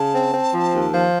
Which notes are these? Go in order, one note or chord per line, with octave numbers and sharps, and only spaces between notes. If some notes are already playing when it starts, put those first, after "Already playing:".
Already playing: C#3 A5
C4
C4
F3
D#2
F3